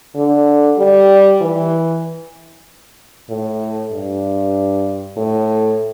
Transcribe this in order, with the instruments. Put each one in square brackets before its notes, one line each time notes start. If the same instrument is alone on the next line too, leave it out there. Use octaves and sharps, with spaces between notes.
[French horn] D3
G3
E3
A2
G2
A2